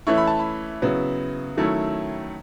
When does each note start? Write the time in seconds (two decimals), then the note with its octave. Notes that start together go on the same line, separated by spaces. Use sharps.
0.07 E3 A3 C#4 E4 C#6
0.18 B5
0.27 A5
0.39 B5
0.82 C#3 F#3 B3 E4
1.57 D#3 F#3 A3 C#4 E4